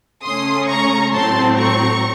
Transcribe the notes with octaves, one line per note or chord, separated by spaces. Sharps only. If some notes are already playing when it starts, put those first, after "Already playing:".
C#3 A3 C#4 C6 D#6
A#5 C#6
A2 F#3 C4 A5 C6
A#5 C#6